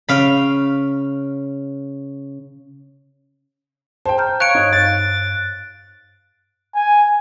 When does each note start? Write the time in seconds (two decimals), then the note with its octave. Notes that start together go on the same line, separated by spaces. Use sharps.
0.09 C#3 F5 B5
4.06 C5 G5 A5
4.17 A#5 F6 G6
4.40 C#5 F5 F#6 D7
4.55 G2 D#4 C5
4.73 F5 A6
6.75 G#5